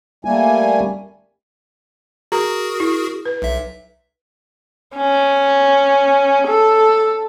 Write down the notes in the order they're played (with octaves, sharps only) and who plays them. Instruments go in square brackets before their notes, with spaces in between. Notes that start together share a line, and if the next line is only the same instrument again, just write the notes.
[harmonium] G3 A3 A#3 G#5
[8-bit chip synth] F#4 G#4 A#4 [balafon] A#5
[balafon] E4
B4
[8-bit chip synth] B1 E5
[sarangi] C#4
A4